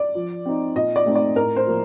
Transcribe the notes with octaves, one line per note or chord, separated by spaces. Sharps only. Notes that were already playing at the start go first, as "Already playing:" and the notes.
Already playing: D5
F3
C4 D#4
A#2 D#5
D5
A3 C4 D#4
D5
A2 A#4
C5
F3 A#3